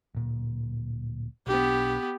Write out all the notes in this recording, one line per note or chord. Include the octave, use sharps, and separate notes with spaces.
D1 A#2
B1 B3 D4 G4